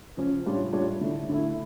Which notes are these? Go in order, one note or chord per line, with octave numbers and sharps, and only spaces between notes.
C#3 F3 C#4
A2 G3 D4 F4 C#5
A2 G3 D4 F4 C#5
D3 A3 E4
D3 A3 E4